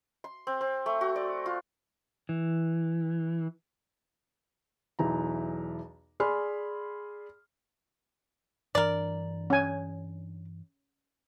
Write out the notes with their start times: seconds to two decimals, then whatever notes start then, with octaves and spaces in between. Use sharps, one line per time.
0.24 C6
0.47 C4
0.61 C4
0.86 A3
1.01 F#4
1.16 D5
1.46 F4
2.29 E3
4.99 B1 E2 E3 A#5
6.20 G#4 D5 G#5 B5 C6 F6
8.75 G2 E3 D4 A#4 D5
9.50 C#4 G#5